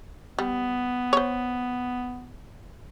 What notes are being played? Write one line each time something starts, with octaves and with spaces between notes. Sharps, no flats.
G3 B3
C5 C#5